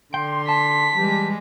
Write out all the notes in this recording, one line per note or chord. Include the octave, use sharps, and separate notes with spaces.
D3 G5 C6
A5 B6
E3 G3 G#3 G4